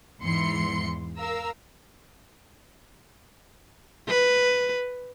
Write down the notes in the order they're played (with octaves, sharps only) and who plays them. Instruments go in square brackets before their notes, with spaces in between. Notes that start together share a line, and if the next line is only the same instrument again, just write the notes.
[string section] E2 G#2 E3 C6 C#7
A#4 F5 A#5 E6
[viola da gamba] B4